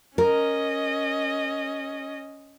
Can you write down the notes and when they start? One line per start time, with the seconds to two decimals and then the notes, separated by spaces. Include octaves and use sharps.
0.18 C#4 A#4 D#5